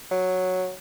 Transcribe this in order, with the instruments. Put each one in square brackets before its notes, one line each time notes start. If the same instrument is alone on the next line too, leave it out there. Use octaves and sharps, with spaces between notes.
[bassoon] F#3